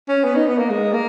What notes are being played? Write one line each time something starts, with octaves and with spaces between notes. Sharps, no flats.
C#4
B3
D#4
B3
A#3
G#3
A#3